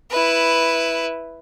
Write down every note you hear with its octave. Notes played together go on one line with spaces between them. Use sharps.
E4 B4